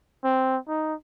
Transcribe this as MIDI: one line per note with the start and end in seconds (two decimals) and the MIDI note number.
0.24 0.58 60
0.68 0.94 63